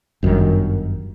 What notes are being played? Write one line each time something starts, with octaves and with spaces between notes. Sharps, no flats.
G1 F#2 C3 D#3